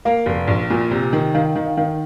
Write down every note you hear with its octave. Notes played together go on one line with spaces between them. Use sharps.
A#3 F5
F1
A#1
A#2
C3
D#3
D#3 F5
F5
D#3 D#5
F5
D#3 F5